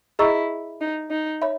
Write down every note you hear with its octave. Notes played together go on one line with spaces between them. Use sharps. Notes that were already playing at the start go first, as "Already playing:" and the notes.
E4 G#4 D#5 A#5 C#6 E6
D#4
D#4
C#5 E5 B5